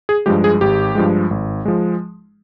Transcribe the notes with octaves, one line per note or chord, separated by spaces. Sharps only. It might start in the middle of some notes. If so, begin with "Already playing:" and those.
G#4
G2 F3 G#3 G4
G#4
G#1 G4
G2 F3 G#3
G#1
F3 G#3